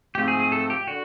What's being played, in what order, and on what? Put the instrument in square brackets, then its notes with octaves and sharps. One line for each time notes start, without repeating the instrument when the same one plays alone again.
[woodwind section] G#2 F3 A3 C4 [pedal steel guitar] G4
[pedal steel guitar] G#4
G#4
A4
G4
[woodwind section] D3 [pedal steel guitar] F#4